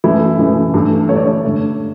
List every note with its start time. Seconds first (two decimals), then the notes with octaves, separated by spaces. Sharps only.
0.04 F#2 E3 A3 E4
0.39 F#2 E3 A3
0.74 G2 E3 A3
1.09 G2 E3 A3 C#5
1.16 D5
1.25 C#5
1.44 G2 D3 A3